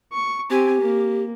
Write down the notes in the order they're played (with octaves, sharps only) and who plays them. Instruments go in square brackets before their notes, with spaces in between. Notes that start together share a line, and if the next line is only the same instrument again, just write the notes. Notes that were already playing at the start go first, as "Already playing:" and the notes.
[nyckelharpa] C#6
[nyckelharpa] C4 G#5 [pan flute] G4
[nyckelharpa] A#3